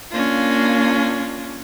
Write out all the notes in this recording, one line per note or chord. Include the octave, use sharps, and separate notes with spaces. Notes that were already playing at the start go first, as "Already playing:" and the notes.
A#3 C#4 D4 F4